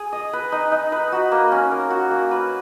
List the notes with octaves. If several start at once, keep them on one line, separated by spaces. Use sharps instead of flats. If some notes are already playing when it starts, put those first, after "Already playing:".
Already playing: G#4
D#5
B4
D#4
D#4
B4
F#4
A#3
C#4
A#4
F#4
A#3
B4